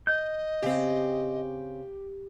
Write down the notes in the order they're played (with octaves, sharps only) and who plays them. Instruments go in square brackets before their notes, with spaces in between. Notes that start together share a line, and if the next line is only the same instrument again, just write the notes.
[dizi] D#5 [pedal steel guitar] G6
[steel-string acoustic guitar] C#3 C4 [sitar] G4